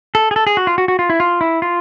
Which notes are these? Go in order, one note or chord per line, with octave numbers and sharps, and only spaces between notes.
A4
G#4
A4
G#4
F#4
F4
F#4
F#4
F4
E4
F4
E4
F4